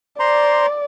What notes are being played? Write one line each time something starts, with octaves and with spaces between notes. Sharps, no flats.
C5 D5 A#5 C6